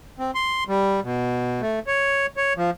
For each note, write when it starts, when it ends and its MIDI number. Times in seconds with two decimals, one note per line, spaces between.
0.19 0.31 60
0.35 0.64 84
0.68 1.00 55
1.04 1.61 47
1.61 1.79 57
1.87 2.26 73
2.37 2.53 73
2.57 2.70 53